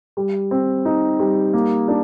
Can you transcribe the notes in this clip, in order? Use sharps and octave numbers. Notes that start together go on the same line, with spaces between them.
G3
C4
D#4
G3
A#3
D4